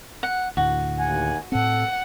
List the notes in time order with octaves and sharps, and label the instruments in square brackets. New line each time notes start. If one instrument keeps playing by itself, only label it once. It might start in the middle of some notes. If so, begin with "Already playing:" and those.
[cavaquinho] F#5
[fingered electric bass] D2 A2 [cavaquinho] F#4
[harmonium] D#2 F#5 G#5
[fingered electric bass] A2 C4 [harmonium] A4 [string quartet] F#5